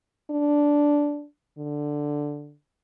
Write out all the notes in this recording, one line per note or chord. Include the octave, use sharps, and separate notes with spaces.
D4
D3